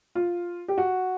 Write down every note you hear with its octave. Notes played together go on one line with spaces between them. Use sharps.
F4
G4
F#4